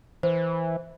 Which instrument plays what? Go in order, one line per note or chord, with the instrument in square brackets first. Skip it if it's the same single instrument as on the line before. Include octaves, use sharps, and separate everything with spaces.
[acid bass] E3 [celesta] C5